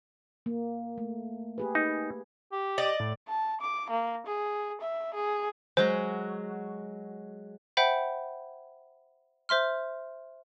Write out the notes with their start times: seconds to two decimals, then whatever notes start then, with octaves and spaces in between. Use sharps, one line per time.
0.46 A#3
0.98 A3
1.58 G4 G#4 B4
1.75 D#4
2.52 G4
2.78 D5 D#5
3.00 A2
3.28 A5
3.61 D6
3.90 A#3
4.26 G#4
4.81 E5
5.14 G#4
5.77 F#3 G#3 F#4 C5
7.77 C5 E5 F#5 G5 B5
9.49 C5 E5 C6 F6